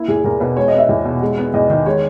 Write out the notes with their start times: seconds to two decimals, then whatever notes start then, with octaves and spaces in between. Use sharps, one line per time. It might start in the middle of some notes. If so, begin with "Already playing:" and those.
Already playing: A#3 E4
0.08 E2 G#4
0.24 E2 A#4
0.40 B2 B4
0.57 G#3 C#5
0.68 D#5
0.73 B3 E5
0.89 E2
1.05 B2
1.22 G#3
1.38 B3
1.54 E2 D#5
1.70 D#3 D#5
1.86 G#3 C#5